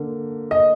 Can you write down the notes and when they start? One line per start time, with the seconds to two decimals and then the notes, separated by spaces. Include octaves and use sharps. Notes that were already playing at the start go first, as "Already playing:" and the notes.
Already playing: D3 A#3
0.51 D#5